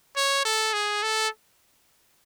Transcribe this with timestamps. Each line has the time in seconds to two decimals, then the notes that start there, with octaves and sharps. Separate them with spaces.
0.16 C#5
0.45 A4
0.74 G#4
1.03 A4